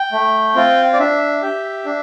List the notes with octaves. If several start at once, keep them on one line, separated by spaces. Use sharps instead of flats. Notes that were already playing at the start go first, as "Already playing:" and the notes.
Already playing: G5
A3
C4 F4
D5
D4 E5
G4
D4